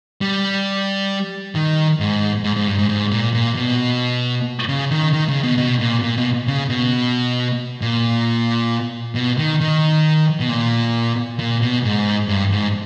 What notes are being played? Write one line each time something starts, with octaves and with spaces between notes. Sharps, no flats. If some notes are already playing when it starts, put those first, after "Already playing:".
G3
D#3
G#2
G#2
G#2
G2
G#2
G#2
A#2
A#2
B2
C#3
D#3
D#3
C#3
B2
B2
A#2
A#2
B2
C#3
B2
A#2
B2
D#3
D#3
B2
A#2
A#2
B2
G#2
G2
G#2